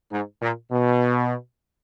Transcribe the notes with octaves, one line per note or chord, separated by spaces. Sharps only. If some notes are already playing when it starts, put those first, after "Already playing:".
G#2
A#2
B2